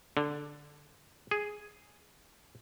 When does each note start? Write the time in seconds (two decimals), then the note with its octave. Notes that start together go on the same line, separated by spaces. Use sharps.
0.17 D3
1.31 G#4